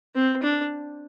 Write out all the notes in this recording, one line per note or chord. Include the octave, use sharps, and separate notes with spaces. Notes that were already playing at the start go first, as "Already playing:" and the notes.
C4
D4